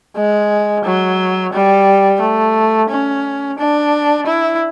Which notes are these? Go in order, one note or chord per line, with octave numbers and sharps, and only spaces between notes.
G#3
F#3
G3
A3
C#4
D4
E4